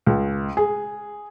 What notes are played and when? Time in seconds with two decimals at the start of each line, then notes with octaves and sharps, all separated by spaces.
0.06 C#2
0.57 G#4